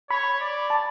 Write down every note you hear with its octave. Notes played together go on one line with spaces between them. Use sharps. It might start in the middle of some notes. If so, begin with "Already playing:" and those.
C#5 B5
D5
A5